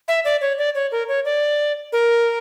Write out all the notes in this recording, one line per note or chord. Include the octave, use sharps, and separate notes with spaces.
E5
D5
C#5
D5
C#5
A#4
C#5
D5
A#4